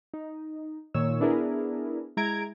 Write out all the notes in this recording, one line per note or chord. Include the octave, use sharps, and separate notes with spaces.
D#4
A#2 D#3 C#5 E6
B3 D4 E4 G#4 A#4
G#3 E4 A#5 G#6 D7